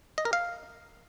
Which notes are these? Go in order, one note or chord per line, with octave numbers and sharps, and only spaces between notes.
D#5
A#4
F5